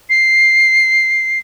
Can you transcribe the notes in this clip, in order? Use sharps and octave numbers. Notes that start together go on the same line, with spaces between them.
C7